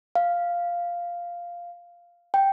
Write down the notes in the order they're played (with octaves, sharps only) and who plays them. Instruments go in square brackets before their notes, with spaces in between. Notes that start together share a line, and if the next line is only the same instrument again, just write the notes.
[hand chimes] F5
G5